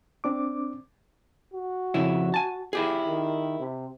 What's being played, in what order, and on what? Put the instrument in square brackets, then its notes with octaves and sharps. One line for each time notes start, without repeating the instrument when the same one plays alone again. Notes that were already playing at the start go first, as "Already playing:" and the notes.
[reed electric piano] C4 D4 D6
[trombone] F#4
[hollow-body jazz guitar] F2 C#3 E4
G#5 A5
E4 G4 G#4
[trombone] D#3
C3